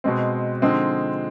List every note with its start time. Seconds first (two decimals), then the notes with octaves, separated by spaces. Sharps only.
0.04 B2 G#3 C4
0.62 D3 F3 G#3 C4 D#4